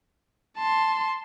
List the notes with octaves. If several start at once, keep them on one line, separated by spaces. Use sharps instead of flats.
A5 C6